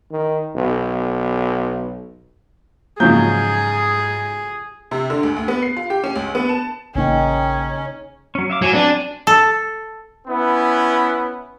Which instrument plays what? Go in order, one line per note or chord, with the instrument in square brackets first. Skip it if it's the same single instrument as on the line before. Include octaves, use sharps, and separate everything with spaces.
[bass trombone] D#3
B1
[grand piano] G#2 G6 [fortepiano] C#3 F3 F#3 [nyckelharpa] G#4
[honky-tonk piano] C3
D3
C#2
D2
B3
C7
F4
G4
C#4
C#2
B3
A5
[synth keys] A1 A#3 G5 [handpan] C#3 D#4 [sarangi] C#4
[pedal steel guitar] F#3 C#4
E5 F5 D6
[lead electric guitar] F#3 [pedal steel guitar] C#5 G#5
[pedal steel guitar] C4 G#5 [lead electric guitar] D4
[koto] A4
[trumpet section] B3 C#4 E4 B4